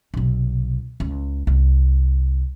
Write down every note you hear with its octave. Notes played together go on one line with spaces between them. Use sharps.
B1 C3
C#2
C2